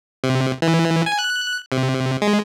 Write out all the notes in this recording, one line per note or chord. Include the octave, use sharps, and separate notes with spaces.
C3
E3
G#5
F#6
C3
G#3